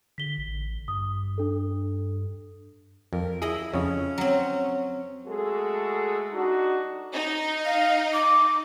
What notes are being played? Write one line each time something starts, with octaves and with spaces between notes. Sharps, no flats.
D3 B6 G7
A1
G2 D#6
D4 A4
F2 A#4
E4 G#4 D#5 B5
F2 C#3 C#4
F#3 C4
G#3 A3 F#4 G#4 A4
D4 D#4 F#4
D#4
F5
D6